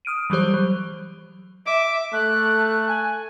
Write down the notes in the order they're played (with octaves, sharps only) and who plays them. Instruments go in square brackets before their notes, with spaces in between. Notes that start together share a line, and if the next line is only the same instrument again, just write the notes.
[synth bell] D#6 F6 D7 D#7
E3 F#3 G3 G4 C5
F#3
[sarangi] E5 [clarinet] D6
[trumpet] A3 [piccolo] F#6
[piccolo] G#5